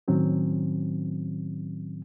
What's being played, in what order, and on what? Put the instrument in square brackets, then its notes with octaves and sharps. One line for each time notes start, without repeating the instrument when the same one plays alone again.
[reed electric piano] A2 D#3 F#3 C4 C#4